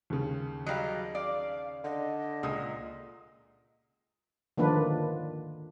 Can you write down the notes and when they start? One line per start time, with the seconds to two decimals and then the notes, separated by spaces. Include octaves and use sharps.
0.10 D#2 C#3
0.66 F#3 G3 D#5 F5
1.15 D5 F5
1.84 D3 D#5
2.43 C#2 A#2 D#6
4.58 D3 D#3 F3 A#3 D4 B4